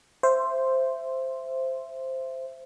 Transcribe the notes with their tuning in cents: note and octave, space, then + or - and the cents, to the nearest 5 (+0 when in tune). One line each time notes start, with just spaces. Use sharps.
C5 +0 E5 +20